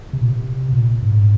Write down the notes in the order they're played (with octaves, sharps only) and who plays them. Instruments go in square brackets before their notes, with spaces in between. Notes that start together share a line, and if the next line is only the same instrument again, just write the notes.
[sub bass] C3
A#2
C3
A#2
G#2